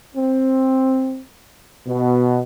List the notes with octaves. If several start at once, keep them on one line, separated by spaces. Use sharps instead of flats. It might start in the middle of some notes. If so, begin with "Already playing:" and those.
C4
B2